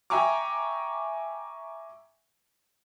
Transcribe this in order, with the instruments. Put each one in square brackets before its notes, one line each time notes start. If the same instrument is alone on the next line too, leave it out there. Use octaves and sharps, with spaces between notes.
[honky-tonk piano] E5 G5 G#5 A#5 C#6 D6